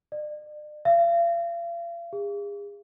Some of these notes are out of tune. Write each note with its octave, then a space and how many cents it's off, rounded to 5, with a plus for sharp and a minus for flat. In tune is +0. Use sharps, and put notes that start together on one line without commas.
D5 +40
F5 -40
G#4 -40